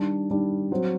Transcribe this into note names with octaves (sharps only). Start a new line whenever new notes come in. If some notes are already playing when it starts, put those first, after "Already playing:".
Already playing: D#3 G3 D4
D#3 G3 D4
F#3 C4 F#4 C5